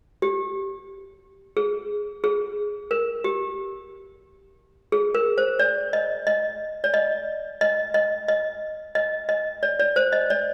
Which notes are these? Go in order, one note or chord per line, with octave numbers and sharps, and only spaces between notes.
G4
G#4
G#4
A#4
G4
G#4
A#4
C5
D5
D#5
D#5
D5
D#5
D#5
D#5
D#5
D#5
D#5
D5
D5
C5
D#5
D5